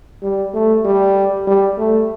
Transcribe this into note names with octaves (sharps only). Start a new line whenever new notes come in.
G3
A3
G3
G3
A3